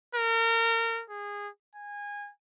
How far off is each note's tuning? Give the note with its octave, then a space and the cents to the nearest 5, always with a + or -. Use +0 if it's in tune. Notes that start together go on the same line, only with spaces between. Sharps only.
A#4 -30
G#4 -20
G#5 -20